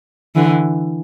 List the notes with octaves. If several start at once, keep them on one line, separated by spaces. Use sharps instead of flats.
D3 E3